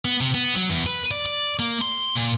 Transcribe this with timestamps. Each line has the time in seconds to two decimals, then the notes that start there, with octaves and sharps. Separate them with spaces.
0.05 B3
0.21 C3
0.34 B3
0.55 F#3
0.70 E2
0.86 B4
1.11 D5
1.26 D5
1.59 A#3
1.81 C6
2.15 A#2